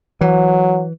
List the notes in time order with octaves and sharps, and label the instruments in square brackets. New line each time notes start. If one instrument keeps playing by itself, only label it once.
[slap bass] E3 [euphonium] F#3